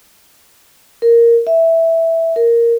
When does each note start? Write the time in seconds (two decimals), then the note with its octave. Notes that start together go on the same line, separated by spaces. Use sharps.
1.02 A#4
1.47 E5
2.36 A#4